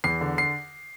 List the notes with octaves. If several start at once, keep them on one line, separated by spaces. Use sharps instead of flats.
E2 C7
D3
C7